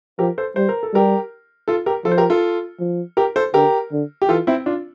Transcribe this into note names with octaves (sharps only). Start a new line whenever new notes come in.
F3 G4 A#4
A4 C5
G3 C5
A#4
A4
G3 G4 A#4
F4 A4
G4 A#4
F3 F4 A4
C5
G4 A#4
F4 A4
F3
G4 A#4
A4 C5
D3 G4 A#4
D3
G4
E3 F4 A4
C4 E4
D4 F4